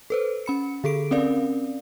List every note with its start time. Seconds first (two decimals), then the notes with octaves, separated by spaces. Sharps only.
0.10 A4 B4 C5
0.46 C#4 B5 C#7
0.84 D3 G#4 A4 D7
1.11 C4 C#4 A#4 D5 F5